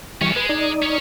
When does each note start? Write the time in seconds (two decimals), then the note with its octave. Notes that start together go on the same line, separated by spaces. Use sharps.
0.21 B2 E3 G3 C#4 C#6
0.36 G#3 B4
0.49 D#4 D5
0.83 C#4 C#5